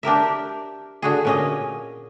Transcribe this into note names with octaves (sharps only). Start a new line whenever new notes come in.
D4 G4 A#4 E5
D3 F#4 G#4
A#2 C#4 D#5